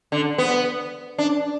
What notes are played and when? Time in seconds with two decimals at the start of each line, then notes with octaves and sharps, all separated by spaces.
0.12 D3
0.38 B3
1.18 D4